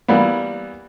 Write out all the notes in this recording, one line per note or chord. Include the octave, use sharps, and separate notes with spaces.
E3 G3 A#3 B3